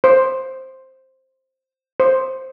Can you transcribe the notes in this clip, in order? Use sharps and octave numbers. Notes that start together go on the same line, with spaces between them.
C5
C5